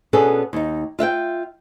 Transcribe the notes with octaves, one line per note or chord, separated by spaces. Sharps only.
B2 B3 C#4 D4 G#4 A4
D#2 D#4
F4 E5 F#5 G5